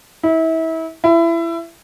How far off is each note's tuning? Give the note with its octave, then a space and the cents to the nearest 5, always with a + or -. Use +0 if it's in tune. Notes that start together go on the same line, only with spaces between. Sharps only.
E4 -30
E4 +25